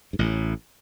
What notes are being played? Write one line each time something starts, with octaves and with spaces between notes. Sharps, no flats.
G2
A1 A2